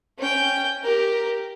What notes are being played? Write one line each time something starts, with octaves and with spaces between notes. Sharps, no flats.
C#4 G5
G4 A#4